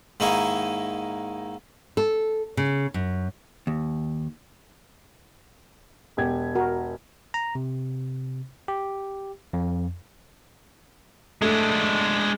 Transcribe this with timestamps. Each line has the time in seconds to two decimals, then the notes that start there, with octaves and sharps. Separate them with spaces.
0.20 G#2 D#3 A#3 E4 G#5 C#6
1.97 A4
2.57 C#3
2.94 F#2
3.67 D#2
6.17 E1 G4 G#6
6.55 F#4 A#4
7.34 A#5
7.55 C3
8.68 G4
9.53 F2
11.42 G#3 A3 D4